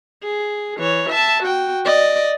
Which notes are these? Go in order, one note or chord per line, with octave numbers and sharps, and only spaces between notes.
G#4
E3 C#5
E5 A5
F#4 G5
D5 D#5